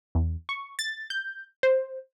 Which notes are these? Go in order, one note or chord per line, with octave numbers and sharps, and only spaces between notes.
E2
C#6
A6
G6
C5